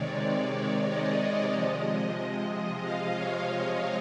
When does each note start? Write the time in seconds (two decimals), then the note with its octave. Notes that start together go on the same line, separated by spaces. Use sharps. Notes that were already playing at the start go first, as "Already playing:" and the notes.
Already playing: C3 D#3 G#3 C#5 D5
0.23 D5
0.88 D#5
1.52 C3 F3 G#3
2.82 F5
3.15 C#5